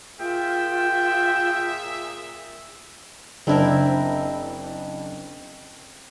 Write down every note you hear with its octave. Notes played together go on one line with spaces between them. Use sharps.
A#2 F4 G#4 E5 G5
F#1 C4 D4 E4 A#4